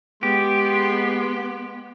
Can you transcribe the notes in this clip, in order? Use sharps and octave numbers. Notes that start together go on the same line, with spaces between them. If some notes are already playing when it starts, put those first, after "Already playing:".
G#3 B3 G4 C6